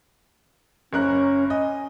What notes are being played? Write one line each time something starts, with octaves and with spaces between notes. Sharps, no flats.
F#1 C#4 A#4 F#6
D#5 G#5